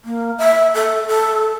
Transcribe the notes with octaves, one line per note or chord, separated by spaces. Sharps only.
A#3
E5
A4
A4